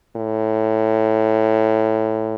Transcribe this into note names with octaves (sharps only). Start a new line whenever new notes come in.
A2